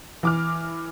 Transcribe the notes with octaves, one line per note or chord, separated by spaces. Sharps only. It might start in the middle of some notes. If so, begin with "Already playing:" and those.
E3 D6 F6